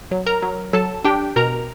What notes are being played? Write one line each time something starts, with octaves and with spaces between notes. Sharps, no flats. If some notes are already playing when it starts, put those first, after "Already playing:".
F#3
A#4 A#5
F#3
F#3 A4 A5
D4 G4 G5
B2 A#4 A#5